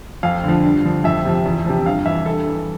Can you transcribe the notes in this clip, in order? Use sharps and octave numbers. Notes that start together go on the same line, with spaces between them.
F2 F5
D3
F3
G2
D3 F3
F2 E5
C3 F3
E2
C3 F3
G2 F5
E3 E5
G2 A4
E3